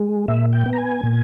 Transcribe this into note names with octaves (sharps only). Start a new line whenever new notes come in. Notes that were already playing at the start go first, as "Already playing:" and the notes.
Already playing: G#3
A#2 E5
G5
B3
A#5
G#5
A#2